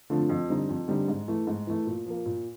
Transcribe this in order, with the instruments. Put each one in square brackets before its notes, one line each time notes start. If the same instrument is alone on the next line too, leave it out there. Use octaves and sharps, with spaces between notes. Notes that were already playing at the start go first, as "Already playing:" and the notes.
[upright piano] D3 F3 A3 C4
F2
D3 G3 C4 D#4
F2
D3 G3 C4 D#4
G#2
E3 A3
G#2
E3 A3
A#2
F3 A#3
A#2